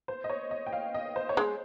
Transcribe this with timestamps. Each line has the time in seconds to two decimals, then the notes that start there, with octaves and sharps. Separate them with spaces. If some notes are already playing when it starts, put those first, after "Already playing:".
0.08 C5
0.24 D#5
0.30 C#5
0.51 D#5
0.66 G5
0.73 F5
0.94 D#5
1.16 C5
1.29 C#5
1.37 G#3 C5